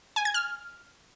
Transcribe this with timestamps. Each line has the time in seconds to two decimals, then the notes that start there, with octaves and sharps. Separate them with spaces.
0.16 G#5
0.25 G#6
0.34 F6